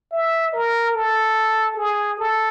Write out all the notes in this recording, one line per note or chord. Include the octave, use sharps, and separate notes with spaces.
E5
A#4
A4
G#4
A4